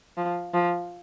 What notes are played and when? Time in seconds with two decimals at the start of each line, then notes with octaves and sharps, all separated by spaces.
0.17 F3
0.54 F3